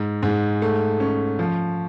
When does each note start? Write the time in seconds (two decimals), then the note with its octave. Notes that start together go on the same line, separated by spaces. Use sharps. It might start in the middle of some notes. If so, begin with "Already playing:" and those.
Already playing: G#2
0.23 G#2
0.62 A3
1.00 C#4
1.39 F3